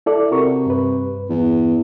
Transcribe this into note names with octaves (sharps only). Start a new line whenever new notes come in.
E4 A4 D5
C3 F#4 A#4 C#6
G2 B4
E2